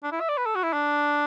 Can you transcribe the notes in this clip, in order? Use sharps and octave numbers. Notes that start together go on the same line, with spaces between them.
D4
E4
E5
D5
B4
A4
F#4
E4
D4